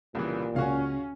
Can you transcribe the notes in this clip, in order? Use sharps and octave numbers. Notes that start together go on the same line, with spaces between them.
C2 A#2 C#3 E3
C#2 C#4 F#4 F5